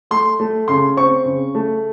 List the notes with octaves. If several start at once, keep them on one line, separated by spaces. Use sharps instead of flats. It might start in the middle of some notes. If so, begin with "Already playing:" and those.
A3 C6
A3
C#3 C6
C4 C#6
C#3
A3